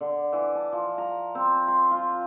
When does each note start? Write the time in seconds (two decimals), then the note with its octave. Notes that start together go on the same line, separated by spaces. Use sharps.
0.01 D3
0.33 E3
0.55 A5
0.72 F3
0.98 A#5
1.35 C4
1.68 C6
1.91 F4